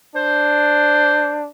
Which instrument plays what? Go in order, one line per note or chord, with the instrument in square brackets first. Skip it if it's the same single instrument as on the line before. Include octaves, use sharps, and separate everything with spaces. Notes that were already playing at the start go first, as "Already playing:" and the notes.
[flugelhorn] D4 [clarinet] C5